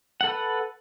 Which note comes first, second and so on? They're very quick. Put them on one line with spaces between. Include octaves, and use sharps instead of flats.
F#5 A4 B4